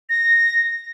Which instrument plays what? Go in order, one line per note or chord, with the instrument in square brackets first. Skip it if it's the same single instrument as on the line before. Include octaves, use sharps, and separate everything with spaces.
[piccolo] A#6